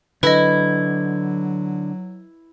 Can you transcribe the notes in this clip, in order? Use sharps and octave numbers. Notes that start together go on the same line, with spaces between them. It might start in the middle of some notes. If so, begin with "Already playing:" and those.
D3 F#3 E4 B4 D#5